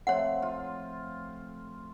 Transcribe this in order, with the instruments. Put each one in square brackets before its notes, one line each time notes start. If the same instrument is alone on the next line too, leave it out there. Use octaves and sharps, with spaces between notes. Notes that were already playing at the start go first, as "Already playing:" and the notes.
[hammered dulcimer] F3 A3 C4 [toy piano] C#5 F#5
[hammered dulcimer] F4